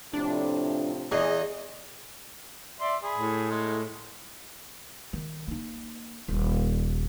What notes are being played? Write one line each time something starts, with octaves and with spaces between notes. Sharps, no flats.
A2 C3 F3 D4
E2 G#4 D#5
D5 E5 C6
G#4 B5
A2
G#3
D#3
A#3 D#4
D#1